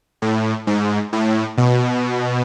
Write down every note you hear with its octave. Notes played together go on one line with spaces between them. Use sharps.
A2
G#2
A2
B2